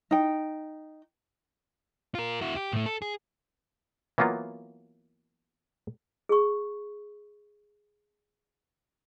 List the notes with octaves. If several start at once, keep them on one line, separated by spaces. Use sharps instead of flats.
D#4 G5
F4 A#4
E4 F#4
G4
A2 A3
A4
G#4
E3 F#3 A#3 B3 F4
G#4 C#6